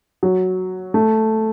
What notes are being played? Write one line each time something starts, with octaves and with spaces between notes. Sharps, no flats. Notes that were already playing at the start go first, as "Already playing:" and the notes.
F#3
A3